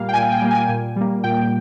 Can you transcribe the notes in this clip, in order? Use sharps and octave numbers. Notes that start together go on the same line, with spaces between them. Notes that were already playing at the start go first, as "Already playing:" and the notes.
Already playing: A#2 G3 A#3 F5
G5
A#2 G#5
G5
G3 A#3
G#5
A#2
G3 A#3
A#2 G5